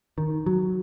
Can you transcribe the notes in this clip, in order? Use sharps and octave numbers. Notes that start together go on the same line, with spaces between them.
D#3
F#3